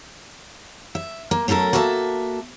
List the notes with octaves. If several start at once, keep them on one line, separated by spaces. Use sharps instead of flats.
E5
A#3
F#3 A3 C#4 A4 A#4
A#3 F#4 A4 A#4 E5 A5